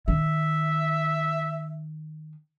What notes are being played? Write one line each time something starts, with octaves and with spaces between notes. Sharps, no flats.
D#3 E5